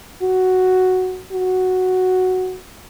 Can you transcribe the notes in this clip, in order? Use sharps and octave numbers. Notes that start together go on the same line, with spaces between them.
F#4
F#4